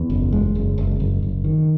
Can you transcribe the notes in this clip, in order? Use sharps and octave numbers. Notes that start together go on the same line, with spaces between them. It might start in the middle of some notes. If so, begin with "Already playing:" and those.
Already playing: E2
F#1
G#3
F#1
F#1
F#1
F#1
D#3